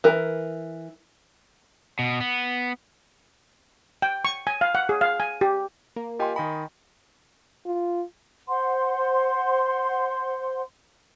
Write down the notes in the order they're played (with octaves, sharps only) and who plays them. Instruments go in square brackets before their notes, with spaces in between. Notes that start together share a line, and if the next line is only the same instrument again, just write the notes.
[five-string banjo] E3 A#4
[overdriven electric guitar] B2
B3
[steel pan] G5
C#6
G#5
F5
F#5
G#4
F5
G#5
G4
[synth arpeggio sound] A#3
[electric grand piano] F4 G4 G#5 [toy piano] D#5 G5 C6
[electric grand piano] D#3 D#5 B5 [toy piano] G#5
[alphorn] F4
[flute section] C5 F#5 C6